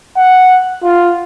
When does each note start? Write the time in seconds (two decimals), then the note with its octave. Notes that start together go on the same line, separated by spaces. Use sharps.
0.17 F#5
0.83 F4